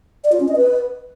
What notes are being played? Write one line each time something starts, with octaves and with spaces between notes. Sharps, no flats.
D5
F4
C#4
D#5
B4